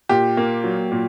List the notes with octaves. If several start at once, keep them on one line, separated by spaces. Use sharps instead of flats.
A#2 G4
A#3
F#3
A#2